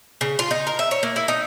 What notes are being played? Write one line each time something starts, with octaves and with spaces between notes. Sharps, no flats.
C#3
F4
D#4
A#4
E5
C#5
A#3
E4
D#4